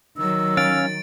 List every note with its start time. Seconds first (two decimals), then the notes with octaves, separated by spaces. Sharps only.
0.17 D#3 F#3 E6
0.57 C#4 F5 A6 D7